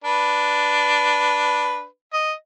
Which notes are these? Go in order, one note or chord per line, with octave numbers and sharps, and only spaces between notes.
D4 B4
D#5